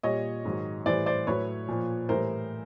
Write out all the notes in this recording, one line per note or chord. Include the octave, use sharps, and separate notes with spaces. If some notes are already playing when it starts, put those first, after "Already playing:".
A#2 G3 C#5 D#5
G#2 D#3 F#3
A2 E3 G3 C5 D5
C5 D5
A2 F#3 B4 C#5
A#2 F3
A2 E3 G3 A#4 C5